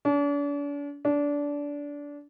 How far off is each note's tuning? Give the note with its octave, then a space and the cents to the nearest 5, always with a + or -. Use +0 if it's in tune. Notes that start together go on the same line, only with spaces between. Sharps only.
D4 -40
D4 -20